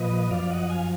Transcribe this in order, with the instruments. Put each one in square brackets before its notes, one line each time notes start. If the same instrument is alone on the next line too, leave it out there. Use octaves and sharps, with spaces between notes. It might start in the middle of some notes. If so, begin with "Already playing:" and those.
Already playing: [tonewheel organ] A#2 F3 B4 D#5
F#2 F3 D5 F5
D#5 F#5
F5 G#5